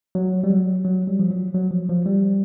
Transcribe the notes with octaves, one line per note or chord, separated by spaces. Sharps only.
F#3
G3
F#3
F#3
G3
F3
F#3
F#3
F3
F3
G3